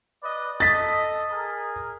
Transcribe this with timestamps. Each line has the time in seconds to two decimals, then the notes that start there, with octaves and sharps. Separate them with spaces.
0.21 B4 D5 D#5
0.60 A4 D#5 A6 B6
1.30 G#4 A#4